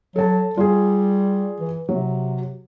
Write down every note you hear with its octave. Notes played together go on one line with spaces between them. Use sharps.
F#3 A4 A5
G3 F4 G#4
E3
C3 F#3